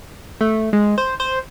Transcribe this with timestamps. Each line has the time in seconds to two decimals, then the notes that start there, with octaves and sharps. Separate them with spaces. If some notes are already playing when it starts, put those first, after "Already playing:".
0.41 A3
0.73 G#3
0.98 C5
1.20 C5